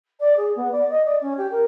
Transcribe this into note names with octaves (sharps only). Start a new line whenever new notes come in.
D5
G#4
B3
D5
D#5
D5
C#4
G4
A#4